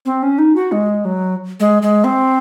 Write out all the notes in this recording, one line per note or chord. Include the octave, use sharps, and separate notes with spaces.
C4
C#4
D#4
F#4
G#3
F#3
G#3
G#3
C4